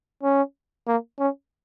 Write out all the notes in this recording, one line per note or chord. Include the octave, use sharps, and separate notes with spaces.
C#4
A#3
C#4